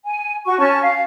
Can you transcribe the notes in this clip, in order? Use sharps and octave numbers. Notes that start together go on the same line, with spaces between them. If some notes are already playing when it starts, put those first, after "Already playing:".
G#5
F#4 C#6
C#4 A5 C#6
F5